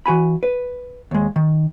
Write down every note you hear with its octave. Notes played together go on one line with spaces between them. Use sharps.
E3 F#4 G#5 B5
B4
D#2 G#3
D#3